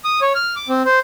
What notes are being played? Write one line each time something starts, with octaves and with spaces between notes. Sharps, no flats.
D#6
C#5
F6
D6
C4
C5